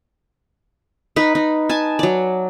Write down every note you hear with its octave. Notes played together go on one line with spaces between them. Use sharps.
D#4 B4
D#4
G#5 A5
F#3 D5